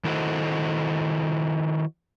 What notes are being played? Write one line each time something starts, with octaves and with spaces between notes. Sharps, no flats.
D#3 E4 F#4 A4 C5 D#5